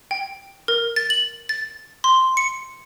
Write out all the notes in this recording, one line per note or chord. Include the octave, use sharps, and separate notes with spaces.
G5
A#4
A6
F#7
A6
C6
C#7